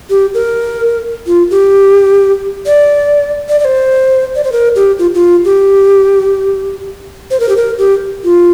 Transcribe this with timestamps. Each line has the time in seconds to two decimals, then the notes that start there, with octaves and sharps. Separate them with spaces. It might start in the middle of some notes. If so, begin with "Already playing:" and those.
0.10 G4
0.34 A#4
1.27 F4
1.51 G4
2.66 D5
3.49 D5
3.60 D5
3.65 C5
4.35 D5
4.44 C5
4.52 A#4
4.76 G4
4.99 F4
5.14 F4
5.45 G4
7.31 C5
7.40 A#4
7.49 G4
7.57 A#4
7.78 G4
8.24 F4